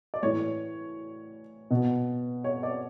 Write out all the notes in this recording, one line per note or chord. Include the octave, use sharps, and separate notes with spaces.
D5
A2 E3 C#5
B2
C#5
D5